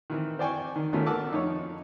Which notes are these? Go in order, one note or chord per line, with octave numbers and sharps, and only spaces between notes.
D#3 E3 C4
C5 D5 G5 G#5 C#6
D#3
G#1 D#3 A3 B3 C#4 F4
A#4 F#5 A5 D6 E6
F2 D#4 E4 C#5 C#6